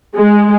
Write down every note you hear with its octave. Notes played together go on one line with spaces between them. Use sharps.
G#3